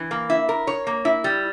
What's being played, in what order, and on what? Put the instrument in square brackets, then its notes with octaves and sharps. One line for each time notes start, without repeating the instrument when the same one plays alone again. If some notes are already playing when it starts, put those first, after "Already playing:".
Already playing: [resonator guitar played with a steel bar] E3
A#3
E4
A#4
C#5
A#3
E4
G3